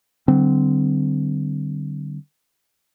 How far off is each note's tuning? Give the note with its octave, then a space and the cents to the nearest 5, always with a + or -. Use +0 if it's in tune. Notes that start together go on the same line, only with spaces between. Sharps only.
D3 +15 G3 -30 C4 -20